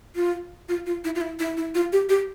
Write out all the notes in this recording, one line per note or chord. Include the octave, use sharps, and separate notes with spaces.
F4
F4
F4
E4
F4
E4
E4
E4
F4
G4
G4